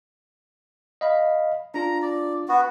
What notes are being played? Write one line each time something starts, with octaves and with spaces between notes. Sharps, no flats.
D#5 F5 B5
D4 F4 A#5
D5
B3 F#4